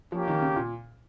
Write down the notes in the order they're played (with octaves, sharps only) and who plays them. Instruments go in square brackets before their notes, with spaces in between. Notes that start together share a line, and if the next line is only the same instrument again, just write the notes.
[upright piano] F3 [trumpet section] A#3 C#4 G4
[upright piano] D#3
C#3
A#2